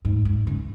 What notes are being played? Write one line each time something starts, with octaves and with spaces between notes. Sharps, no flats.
G#2
G#2
C#3